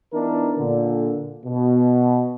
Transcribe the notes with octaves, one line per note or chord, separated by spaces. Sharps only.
E3 B3 D4 D#4 A#4
A#2 D3
B2